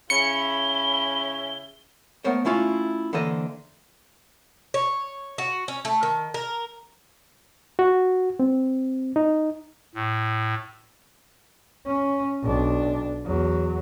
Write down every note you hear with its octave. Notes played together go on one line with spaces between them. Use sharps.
C#3 C#4 E4 B5 C#7 G7
A3 B3 A#4 C5 C#5
A3 C#4 E4 F4 F5
D3 E3 A#3 A4 C5 D#5
C#5
F#4
C#4
A3
D#3
A#4
F#4
C4
D#4
A2
C#4
B1 D4
E2 F#3